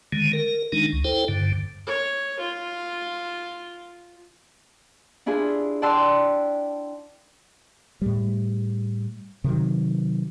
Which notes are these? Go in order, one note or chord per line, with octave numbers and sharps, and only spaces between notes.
D3 D#3 G#3
A#4
D#3 G#3 D4 D#4
C#2
E4 A4 C5 G5
G2 D3
C#5
F4
D4 E4 F4 G#4
D5 F#5 G5 A5 C6 E6
A2 G3
C3 D#3 F#3